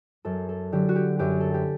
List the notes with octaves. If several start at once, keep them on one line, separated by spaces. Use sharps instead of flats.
F#2 A4
A4
D3 F#3 G4
F#4
G4
F#2 G4
A4
G4